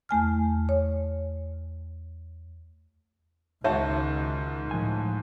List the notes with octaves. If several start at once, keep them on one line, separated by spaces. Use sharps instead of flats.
E2 A3 G#5 F6
C#5
C#2 G#2 D#3 F#4 C#5 E5 A5
A2 F3 G#5